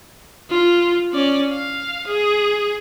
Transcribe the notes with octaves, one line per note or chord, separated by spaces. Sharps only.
F4
C#4 D5
F5
G#4